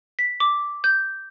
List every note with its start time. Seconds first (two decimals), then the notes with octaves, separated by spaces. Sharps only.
0.19 B6
0.40 D6
0.84 G6